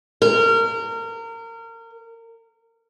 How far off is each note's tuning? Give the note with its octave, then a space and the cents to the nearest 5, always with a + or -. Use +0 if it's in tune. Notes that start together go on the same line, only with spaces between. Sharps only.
A#4 -30